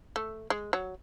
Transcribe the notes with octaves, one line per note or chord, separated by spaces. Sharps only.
A3
G#3
F#3